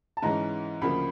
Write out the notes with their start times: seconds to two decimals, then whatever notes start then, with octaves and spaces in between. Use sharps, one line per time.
0.17 A5
0.22 G#2 E3 G#3 C#4 A#5
0.82 D2 C#3 F3 A#3 B5